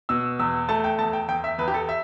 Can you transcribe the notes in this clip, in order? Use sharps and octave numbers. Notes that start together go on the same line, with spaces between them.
B2 E6
E2 E6
A3 A5
G5
E2 A5
G5
E2 G5
E5
E2 B4
G4
A4
E5